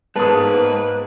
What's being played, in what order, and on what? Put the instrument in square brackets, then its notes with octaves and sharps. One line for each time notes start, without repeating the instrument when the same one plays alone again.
[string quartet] G#2 A#3 [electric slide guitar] G#3 B3 [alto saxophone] B4 [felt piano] A5 D#6